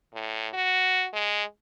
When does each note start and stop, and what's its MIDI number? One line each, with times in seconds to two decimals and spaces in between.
0.14 0.48 45
0.53 1.06 66
1.13 1.43 56